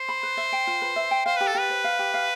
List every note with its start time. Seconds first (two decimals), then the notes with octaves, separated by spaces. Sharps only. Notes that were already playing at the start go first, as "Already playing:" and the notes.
Already playing: C5
0.09 B5
0.23 B4
0.37 E5
0.52 G5
0.67 F4
0.82 B4
0.96 E5
1.11 G5
1.26 C5 F5
1.36 G4 B4
1.47 A4
1.55 G4 B4
1.70 C5
1.84 F5
1.99 G4
2.14 F5